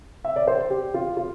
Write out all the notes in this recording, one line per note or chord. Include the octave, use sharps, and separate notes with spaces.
E5
D5
C5
G4
F4
F4